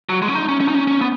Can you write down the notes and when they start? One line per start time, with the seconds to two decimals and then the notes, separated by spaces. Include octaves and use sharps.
0.09 F#3
0.22 G#3
0.28 C#4
0.35 D#4
0.49 C#4
0.60 C#4
0.68 D#4
0.74 C#4
0.87 C#4
1.01 B3